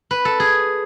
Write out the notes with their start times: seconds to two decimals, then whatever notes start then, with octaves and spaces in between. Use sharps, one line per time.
0.11 B4
0.25 A4
0.40 G#4